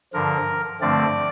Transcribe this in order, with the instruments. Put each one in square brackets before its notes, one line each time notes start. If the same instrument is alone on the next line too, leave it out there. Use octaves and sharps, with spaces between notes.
[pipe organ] G2 D3 F3 A#4
G2 D3 F3 A3 C4 D5